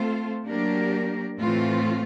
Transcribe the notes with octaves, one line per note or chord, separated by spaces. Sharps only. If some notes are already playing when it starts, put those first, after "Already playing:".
Already playing: A3 C4 F4 A4 C5
F#3 A#3 D4 G4 A#4
A2 E3 A3 C4 F4